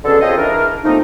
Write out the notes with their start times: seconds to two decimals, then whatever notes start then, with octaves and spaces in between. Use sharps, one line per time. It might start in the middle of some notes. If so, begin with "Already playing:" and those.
0.04 B2 D3 C#4 G#4 A4
0.21 C4 F4 G#4 C5 C#5 D#5
0.37 E3 D4 A#4
0.84 F3 A3 A#3 C4 D#4